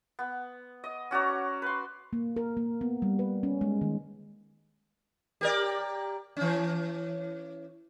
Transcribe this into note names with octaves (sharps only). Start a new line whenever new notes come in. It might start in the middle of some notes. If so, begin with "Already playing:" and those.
B3
D#5
C#4 F#4 D5 A#5
B4 C6
A#3
A#4
A#3
B3
G3
B4
C#4
G#3
D#3
G4 A#4 D5
E3 C#4